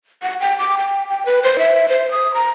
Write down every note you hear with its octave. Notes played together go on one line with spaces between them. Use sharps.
F#5
G5
D6
G5
G5
B4
C5
E5
C5
D#6
A#5